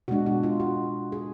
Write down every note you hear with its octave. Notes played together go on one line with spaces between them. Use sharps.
B2 G#3 D4 F#4
F#4
F4
F#4
G#4